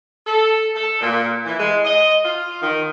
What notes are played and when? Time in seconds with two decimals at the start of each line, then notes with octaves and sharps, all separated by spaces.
0.25 A4
0.75 A4
1.00 A#2
1.45 E3
1.58 G#3
1.84 D#5
2.23 F4
2.61 D#3